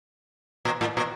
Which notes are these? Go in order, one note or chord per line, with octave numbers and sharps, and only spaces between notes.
A#2
A2
A#2